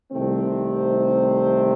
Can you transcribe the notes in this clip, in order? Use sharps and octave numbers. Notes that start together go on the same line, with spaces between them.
C2 C3 D#3 A3 C4
C5